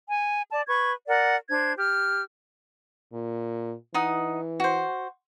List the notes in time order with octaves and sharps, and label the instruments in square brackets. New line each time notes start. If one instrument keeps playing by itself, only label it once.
[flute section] G#5
D5 A5
B4 C#6 G#6
A#4 D5 F#5
D4 C5 G#6
G4 F6
[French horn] A#2
[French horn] E3 [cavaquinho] D#4 F#5 D#6
[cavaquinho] F#4 C5